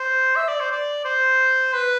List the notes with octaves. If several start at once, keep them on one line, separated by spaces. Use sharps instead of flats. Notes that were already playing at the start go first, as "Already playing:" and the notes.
Already playing: C5
E5
D5
C5
D5
C5
B4